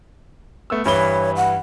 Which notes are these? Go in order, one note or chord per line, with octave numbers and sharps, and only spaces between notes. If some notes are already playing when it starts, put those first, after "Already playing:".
A3 B3 E6
G2 E3 C#5 G7
F#5